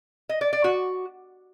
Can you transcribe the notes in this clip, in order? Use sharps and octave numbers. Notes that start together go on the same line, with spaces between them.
D#5
D5
D5
F#4